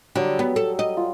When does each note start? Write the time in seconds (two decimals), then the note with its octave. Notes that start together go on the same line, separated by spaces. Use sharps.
0.15 D3 F#3 G3 D#6
0.39 B3
0.56 A4
0.79 D#5
0.97 F4